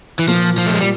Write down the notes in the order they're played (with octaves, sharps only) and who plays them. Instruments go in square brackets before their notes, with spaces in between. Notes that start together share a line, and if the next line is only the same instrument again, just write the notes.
[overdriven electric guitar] E3
[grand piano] A#2 [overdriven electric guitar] F3
[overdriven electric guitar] F3
A3
G#3
G3